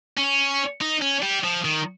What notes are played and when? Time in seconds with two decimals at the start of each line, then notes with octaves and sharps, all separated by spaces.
0.18 C#4
0.81 D#4
1.02 C#4
1.22 G3
1.44 F3
1.65 D#3